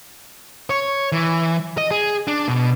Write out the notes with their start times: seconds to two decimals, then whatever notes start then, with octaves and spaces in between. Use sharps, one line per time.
0.70 C#5
1.12 E3
1.78 D#5
1.91 G#4
2.27 D4
2.48 B2